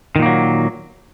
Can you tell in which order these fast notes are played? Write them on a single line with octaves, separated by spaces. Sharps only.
D#3 A#2 A#3 F#3